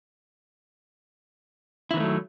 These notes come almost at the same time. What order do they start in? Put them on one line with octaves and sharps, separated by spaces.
E4 D#3 B3 A3 F#3